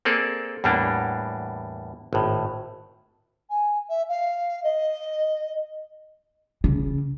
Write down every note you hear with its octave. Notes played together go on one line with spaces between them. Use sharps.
A#3 C4 G#4 A4 D5
E2 A2 G3 A#3 D4
G#1 A2
G#5
E5
F5
D#5
C#3